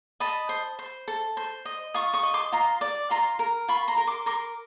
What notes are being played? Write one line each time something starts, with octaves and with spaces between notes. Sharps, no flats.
D#5 A5 B5
C5
C5
A4
C5
D#5
F4 C#6 D#6
C#6 D#6
D#5
C6 D6
F4 A#5 C6
D5
F4 A#5 C6
A#4
F4 B5 C#6
A#5 C6
A#4
C6 D6
A#4 C6 D6